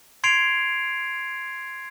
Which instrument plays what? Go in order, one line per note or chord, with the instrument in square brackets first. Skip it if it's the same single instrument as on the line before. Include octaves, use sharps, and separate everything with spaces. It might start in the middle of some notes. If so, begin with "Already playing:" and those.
[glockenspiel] C6 G#6 C7 D7 F7